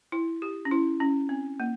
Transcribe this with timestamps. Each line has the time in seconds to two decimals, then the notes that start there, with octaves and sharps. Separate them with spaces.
0.12 E4
0.42 G4
0.65 C#4
0.71 E4
1.00 C#4
1.29 C4
1.60 A#3